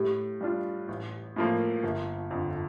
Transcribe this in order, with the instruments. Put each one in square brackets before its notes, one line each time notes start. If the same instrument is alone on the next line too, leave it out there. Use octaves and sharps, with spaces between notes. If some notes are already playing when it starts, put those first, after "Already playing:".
Already playing: [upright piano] A2 [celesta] G4
[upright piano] G3 D4 F4
A1
A2 F3 A#3
G1
F2 D3